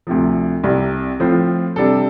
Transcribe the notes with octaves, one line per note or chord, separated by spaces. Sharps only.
D2 C3 F3
C2 C3 G3
A2 F3 C4 F4 C5
C3 G3 D4 A4